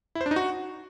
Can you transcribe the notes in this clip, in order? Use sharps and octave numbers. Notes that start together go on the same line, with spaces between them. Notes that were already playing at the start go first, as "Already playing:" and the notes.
E4
C5
D4
D#4
F#4